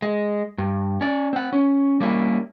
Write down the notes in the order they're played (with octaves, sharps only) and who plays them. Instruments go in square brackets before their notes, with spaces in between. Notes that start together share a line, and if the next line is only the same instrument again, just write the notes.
[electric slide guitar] G#3
G2
C#4 D5
C4 F#5
C#4
G3 A#3 C#4 E4